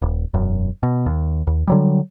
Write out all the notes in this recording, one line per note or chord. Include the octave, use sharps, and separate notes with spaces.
D#1
E1 F#2
B2
D#2
D#2
D3 F#3 G3